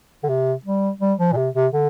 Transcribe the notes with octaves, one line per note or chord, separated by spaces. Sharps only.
D3
C3
G3
G3
F3
A#2
C3
C3
D3